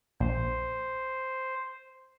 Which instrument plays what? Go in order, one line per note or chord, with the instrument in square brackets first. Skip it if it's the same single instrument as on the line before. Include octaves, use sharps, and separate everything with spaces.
[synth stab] A#1 [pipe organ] C5